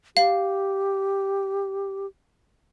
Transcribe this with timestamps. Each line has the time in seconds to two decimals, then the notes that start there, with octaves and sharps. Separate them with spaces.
0.17 G4 F5